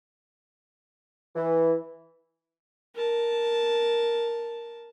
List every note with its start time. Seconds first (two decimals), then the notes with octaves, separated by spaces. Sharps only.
1.36 E3
2.95 A#4 A5